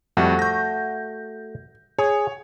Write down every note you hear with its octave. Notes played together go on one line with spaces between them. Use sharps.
F2 G3 A3 F#4
G6 A#6
G#4 C#5